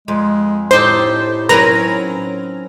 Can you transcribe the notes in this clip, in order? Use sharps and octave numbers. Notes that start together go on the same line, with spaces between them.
F2 G#3
A2 D#4 G4 A4 C5
F#3 C4 C#4 A#4 B4 G#5 A#5